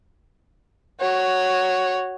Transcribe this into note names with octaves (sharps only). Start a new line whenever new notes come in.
F#4 C#5